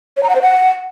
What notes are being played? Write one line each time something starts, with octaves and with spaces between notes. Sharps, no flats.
C#5
A#5
F#5
C5
F#5